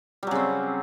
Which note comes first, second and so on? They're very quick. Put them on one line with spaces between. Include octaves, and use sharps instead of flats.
G3 F#3 C#3 C4